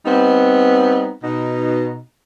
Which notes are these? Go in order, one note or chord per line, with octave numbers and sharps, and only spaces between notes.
G3 B3 C4 D#4
B2 D#4